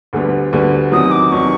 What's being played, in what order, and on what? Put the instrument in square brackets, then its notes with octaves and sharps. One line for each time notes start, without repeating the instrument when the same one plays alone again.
[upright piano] D2 D3 G3 B3
D2 D3 G3 B3
[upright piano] E2 C3 D#3 F#3 [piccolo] D#6
[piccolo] D6
[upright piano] E2 C3 D#3 F#3 [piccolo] C#6